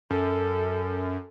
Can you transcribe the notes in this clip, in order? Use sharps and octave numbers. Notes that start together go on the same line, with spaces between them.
F#2 A4